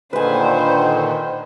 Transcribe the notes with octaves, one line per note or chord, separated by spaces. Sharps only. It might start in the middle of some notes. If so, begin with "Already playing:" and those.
A#2 D3 D#3 B4 C5 G#5